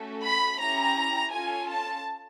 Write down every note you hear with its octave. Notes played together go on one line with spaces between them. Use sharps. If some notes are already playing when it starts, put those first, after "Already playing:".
Already playing: A3 C#4 F#4 A4
B5
C#4 E4 G4 A#5
C#4 F4 A4 G#5
A5